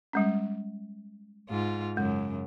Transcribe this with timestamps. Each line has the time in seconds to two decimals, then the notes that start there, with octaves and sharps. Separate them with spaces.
0.13 G3 G#3 C#4
1.50 G#2 F4
1.97 F#2 C#3 G#3